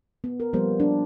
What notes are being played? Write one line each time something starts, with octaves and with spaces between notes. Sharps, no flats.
B3
A#4
F3 G3 A#3 B3 C5
D4